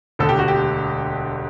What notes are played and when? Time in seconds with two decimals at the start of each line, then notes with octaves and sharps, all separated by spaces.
0.19 E1 D2 D3 A4
0.29 G4
0.39 F#4
0.48 G4